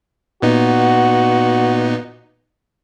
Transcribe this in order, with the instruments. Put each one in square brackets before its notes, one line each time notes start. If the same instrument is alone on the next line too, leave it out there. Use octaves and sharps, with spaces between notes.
[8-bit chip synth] A#2 B3 D#4 [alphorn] F#4